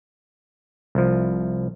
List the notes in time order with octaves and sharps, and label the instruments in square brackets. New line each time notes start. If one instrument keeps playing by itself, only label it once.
[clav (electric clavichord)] C2 F3